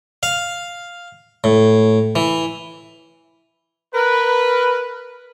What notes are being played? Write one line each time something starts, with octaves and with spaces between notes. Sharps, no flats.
F5
A2
E3
A#4 B4